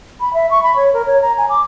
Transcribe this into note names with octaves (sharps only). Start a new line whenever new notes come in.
B5
E5
C#6
B5
C#5
A#4
C#5
A#5
G#5
D6